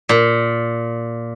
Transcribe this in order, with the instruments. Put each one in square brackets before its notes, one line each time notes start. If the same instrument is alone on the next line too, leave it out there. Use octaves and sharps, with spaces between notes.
[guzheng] A#2